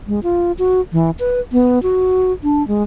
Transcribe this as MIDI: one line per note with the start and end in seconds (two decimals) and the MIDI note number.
0.07 0.20 56
0.23 0.52 65
0.59 0.81 66
0.93 1.11 52
1.19 1.40 71
1.52 1.82 59
1.83 2.32 66
2.43 2.66 62
2.68 2.83 56